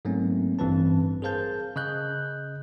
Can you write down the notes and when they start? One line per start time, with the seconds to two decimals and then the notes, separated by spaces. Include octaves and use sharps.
0.05 G#2 F#3 A3 A#3 C4 C#4
0.59 A1 G2 E3 C4 B4 A5
1.22 G#4 A#4 C5 F5 A5 G6
1.76 C#3 D#5 F#6 G6